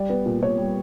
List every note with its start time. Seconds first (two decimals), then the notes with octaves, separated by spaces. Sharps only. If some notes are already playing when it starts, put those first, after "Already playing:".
Already playing: G3 D5
0.09 B3
0.26 A#2
0.42 A#2 C#5
0.58 G3